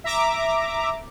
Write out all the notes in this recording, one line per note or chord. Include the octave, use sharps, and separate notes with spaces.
E5 A#5 D6